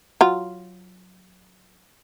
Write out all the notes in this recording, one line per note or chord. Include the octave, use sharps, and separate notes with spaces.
F#3 F4